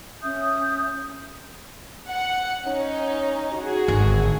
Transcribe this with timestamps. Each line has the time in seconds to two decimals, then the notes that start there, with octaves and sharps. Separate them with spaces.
0.22 C#4 E5 D#6 G6
2.09 F#5
2.66 C#4 D#4
3.59 F#4 G#4
3.88 G#1 D3